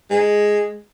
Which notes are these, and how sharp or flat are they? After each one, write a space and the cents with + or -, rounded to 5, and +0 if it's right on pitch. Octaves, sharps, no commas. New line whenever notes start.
G#3 +0